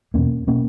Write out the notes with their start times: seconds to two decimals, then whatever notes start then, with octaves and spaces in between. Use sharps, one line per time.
0.14 E2 B2 A#3 C#4
0.47 B2 A#3 C#4